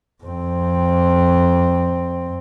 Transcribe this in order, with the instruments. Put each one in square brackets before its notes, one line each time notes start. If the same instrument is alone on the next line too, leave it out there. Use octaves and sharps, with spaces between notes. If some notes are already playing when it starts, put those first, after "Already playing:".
[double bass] F2 C4